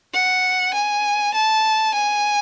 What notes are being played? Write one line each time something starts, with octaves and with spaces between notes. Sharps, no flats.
F#5
G#5
A5
G#5